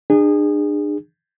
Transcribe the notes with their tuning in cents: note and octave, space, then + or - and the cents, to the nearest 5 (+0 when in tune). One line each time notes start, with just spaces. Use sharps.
D4 +35 G#4 -25